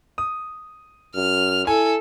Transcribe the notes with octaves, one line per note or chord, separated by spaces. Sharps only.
D#6
F#2 F6
E4 A4 G#5